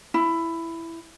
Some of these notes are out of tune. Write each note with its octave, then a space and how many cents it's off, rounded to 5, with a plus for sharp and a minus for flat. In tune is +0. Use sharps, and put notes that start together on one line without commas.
E4 +10